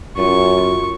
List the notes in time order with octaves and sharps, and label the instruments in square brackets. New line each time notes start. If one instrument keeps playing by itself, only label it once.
[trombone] F#2 [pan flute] F4 [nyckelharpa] C#6